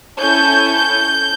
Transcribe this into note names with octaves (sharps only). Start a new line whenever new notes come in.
C#4 E4 A4 G6
G6